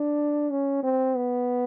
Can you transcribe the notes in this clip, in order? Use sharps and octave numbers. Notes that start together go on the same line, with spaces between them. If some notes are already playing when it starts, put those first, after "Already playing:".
Already playing: D4
C#4
C4
B3